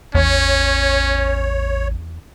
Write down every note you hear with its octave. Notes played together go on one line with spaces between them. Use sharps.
A1 E2 C#4 C#5